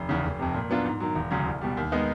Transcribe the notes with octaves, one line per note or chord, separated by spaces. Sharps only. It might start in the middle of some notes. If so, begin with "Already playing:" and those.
Already playing: F1
E2 C#3
F1
F2 C3
A#2
F#3 B3 D4 F4
G#2
D#3 F#3
E1
D2 C#3 F#3
C2
B2 G3
D#2
D#3 G#3 B3 D#4